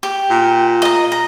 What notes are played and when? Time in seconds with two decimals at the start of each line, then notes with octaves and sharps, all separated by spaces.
0.03 G4
0.31 A#2
0.82 D#5 A#5
1.12 A#5